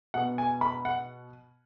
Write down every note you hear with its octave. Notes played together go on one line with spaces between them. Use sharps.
B2 B3 F#5
G#5
B5
F#5